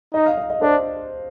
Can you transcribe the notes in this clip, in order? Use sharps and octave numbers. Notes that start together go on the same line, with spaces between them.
D#4 D#5
F5
D#5
D#5
D4 C5